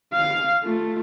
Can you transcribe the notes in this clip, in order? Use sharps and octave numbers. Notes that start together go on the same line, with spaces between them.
F5
A3 F4